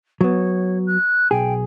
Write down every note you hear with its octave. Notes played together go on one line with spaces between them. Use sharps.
F#3 B3 C#5
F#6
B1 G#4 G5